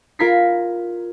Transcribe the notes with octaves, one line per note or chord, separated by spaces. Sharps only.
F4 A#4 A#5 G#6 B6 C7